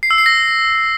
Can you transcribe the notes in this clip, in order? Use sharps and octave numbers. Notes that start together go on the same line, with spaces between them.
C7
E6
C7
A#6